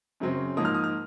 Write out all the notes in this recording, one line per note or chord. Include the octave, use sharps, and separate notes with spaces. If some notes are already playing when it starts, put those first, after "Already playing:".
F#2 C#3 F#3 C4
G#2 F3 A#3 D#6
F6
D#6
F6